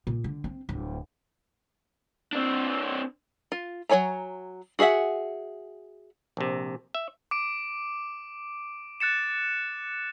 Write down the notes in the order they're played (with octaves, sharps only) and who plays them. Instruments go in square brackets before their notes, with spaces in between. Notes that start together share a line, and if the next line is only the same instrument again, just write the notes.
[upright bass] A#2
D3
C4
D1
[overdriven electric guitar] C4 D4
[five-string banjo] F4
F#3 A4 C#5 G#5 A#5
F#4 G#4 D#5 E5 F#5
[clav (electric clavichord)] A#1 C3
E5
[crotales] D6 D7
F#6 A6 C#7 E7